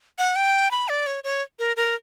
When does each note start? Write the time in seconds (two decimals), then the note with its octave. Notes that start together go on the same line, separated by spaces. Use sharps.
0.19 F#5
0.36 G5
0.71 B5
0.89 D5
1.07 C#5
1.24 C#5
1.59 A#4
1.76 A#4